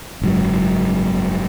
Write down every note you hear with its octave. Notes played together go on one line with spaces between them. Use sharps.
F#1 G#2 F#3